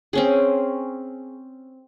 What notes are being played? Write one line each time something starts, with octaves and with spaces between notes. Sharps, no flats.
C4 C#4 G#4